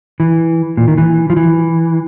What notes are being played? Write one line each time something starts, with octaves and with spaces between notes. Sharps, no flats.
E3
A#2
D#3
E3
F3
E3